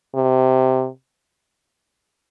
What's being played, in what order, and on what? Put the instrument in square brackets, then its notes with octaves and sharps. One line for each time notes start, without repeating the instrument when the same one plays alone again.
[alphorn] C3